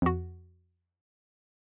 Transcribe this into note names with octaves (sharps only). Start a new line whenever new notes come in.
F2 F#4